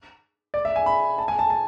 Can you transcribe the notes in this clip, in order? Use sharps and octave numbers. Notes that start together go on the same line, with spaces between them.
D5
E5
G#5
B5
A5
G#5
A5
A5